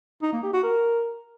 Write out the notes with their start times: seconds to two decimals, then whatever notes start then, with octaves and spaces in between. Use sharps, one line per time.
0.22 D#4
0.33 A#3
0.43 G4
0.53 F#4
0.63 A#4